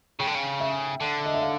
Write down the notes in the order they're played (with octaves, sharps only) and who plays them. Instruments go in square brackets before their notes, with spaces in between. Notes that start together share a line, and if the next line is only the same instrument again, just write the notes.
[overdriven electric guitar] C#3 [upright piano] G5
[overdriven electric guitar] D3
C#3
[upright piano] E5
[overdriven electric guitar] D3
[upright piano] D#5
E5
F5